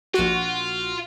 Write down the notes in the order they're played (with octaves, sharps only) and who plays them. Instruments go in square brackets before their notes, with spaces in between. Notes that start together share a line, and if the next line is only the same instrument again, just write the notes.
[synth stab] A#1 F#4 [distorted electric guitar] F4